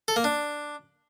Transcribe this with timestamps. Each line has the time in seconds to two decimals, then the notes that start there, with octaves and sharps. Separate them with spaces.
0.08 A4
0.16 A#3
0.24 D4